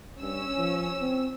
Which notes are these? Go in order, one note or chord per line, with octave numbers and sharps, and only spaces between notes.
G2 C#4 E6
F3
C4